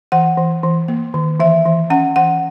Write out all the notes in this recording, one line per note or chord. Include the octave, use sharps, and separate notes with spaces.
E3 F#5
E3
E3
A#3
D#3
E3 E5
E3
C#4 F#5
E3 F#5